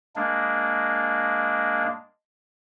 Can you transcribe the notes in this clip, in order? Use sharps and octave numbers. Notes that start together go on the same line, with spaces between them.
G#3 A#3 D4